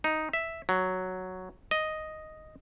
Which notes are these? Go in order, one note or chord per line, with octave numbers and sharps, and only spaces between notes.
D#4
E5
F#3
D#5